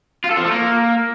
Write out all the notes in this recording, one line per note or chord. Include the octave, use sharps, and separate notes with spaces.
F4
A4
F3
A3
A#3